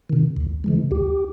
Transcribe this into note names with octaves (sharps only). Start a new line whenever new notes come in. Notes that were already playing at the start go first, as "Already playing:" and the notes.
C3 D#3
D2
C#3 E3 G#3
D2 G4